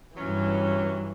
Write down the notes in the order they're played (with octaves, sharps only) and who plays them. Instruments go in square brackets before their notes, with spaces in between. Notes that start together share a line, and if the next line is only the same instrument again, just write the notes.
[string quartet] G2 E3 [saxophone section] F#3 C#4